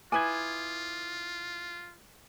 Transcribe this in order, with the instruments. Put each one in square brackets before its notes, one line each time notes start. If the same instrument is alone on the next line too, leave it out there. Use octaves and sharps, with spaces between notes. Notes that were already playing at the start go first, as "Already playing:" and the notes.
[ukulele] E4 B4 G#5 [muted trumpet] F4 [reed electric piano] D6 D#6 G#6